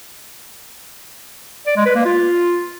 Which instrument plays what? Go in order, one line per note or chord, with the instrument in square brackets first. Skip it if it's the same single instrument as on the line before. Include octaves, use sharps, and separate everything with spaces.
[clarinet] D5
G#3
B4
A#3
F4